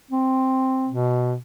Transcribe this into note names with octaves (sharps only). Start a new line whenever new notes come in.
C4
B2